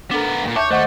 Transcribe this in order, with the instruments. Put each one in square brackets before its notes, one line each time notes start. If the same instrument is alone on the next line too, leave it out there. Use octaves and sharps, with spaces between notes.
[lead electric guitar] B3 A#4 [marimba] D4 A4
[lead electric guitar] G2 A#2
[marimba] D#2 E5 A5 [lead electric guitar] C#5 [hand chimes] D6 G6
[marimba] D#3 C#6 [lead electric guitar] A3 [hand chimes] C5 D#5 F#5